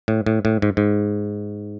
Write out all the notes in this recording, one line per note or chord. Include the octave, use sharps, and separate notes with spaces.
A2
A2
A2
G#2
G#2